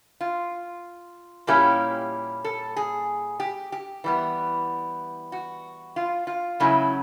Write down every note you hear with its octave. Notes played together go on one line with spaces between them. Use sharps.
F4
A#2 G3 A#3 C#4 E4 G4
A4
G#4
G4
G4
E3 G3 B3
F#4
F4
F4
C#3 F#3 A3 C#4 E4